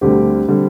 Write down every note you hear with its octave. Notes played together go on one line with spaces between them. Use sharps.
D2 D3 G3 C4 G4
D3 G3 C4 G4